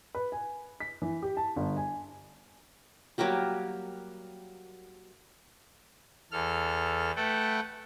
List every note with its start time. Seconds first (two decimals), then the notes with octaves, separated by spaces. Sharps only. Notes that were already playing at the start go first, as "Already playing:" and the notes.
0.15 B4
0.32 G#5
0.80 B6
1.02 E3
1.22 G4
1.37 A5
1.56 G1
1.77 G#5
3.18 F#3 G3 A#3 G4
6.32 E2 A4 F6
7.16 A3 A4 B4 F#5 G5